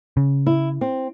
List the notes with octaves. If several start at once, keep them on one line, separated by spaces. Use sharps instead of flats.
C#3
E4
C4